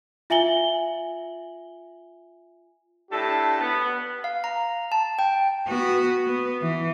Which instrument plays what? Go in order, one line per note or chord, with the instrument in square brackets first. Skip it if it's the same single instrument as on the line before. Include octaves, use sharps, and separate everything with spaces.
[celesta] F4 E5 G#5 F#7 G7
[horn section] A2 D4 G4 A4 E5 A5
B3
[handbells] F5
A#5
A5
G5
[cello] B3 F#4
B3
E3